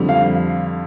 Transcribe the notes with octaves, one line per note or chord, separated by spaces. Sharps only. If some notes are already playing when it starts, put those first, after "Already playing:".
Already playing: F2 D3 G3
F5